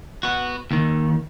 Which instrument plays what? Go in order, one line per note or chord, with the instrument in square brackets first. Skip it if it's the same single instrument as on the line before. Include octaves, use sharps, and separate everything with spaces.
[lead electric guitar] B3 F#4
D#2 D#3